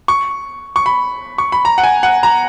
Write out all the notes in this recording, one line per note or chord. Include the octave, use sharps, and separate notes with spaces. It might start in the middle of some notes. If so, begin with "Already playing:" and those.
C#6
C#6
B5
C#6
B5
A#5
F#5
G#5
F#5
A#5